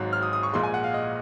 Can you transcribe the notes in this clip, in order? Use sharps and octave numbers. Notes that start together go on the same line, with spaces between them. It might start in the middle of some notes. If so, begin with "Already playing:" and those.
Already playing: G#1 G#2 F#3 F#6
F6
D#6
D#6
C#6
A#1 A#2 G#3 C6
G#5
F#5
F5
D#5